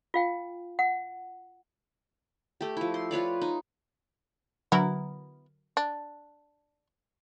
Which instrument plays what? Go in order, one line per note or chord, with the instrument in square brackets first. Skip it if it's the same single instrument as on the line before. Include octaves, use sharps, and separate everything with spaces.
[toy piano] F4 F5 G5
F#5
[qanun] A3 G4
F3 E4
C6
F4 B4 C#5 D5
D#4
[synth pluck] D3 F#3 A#4 [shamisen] B3 E4
[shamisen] D4